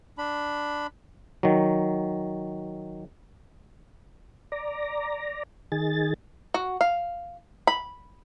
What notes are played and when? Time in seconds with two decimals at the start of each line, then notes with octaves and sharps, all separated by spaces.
0.18 D4 B5
1.43 D#3 F#3
4.52 D5 A#5
5.72 D#3 G#4 A6
6.54 F#4
6.81 F5
7.67 B5